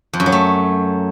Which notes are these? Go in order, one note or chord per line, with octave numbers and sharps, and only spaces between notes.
F2
F#2
F#3
A3